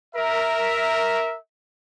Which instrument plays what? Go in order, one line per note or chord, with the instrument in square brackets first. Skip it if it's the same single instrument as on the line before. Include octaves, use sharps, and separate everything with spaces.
[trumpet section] A#4 E5